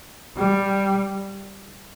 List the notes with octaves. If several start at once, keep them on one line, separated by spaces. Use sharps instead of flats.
G3